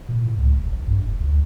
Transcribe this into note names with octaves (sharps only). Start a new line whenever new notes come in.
A#2
A2
C#2
E1
A#1
G2
F1
D2